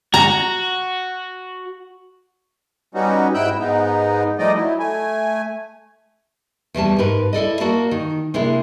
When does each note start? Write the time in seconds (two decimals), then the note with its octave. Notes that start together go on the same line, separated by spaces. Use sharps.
0.14 F#4 A#5
2.95 G3 B3 C#4 D#4 F#4
3.34 G#2 E4 G5 E6 F#6 G6
3.59 G#2 B3 D#4
4.39 F3 G3 A3 D#4 D5 D#5
4.56 F#3 E4
4.79 A3 G#5
6.74 E2 B2 G3 A5
6.99 G#2 G4 A#4 B4
7.33 E4 A4 D5 D#5
7.60 A#3 F#4 D5 A5
7.91 D#3
8.34 C3 G#3 A#3 D4 E4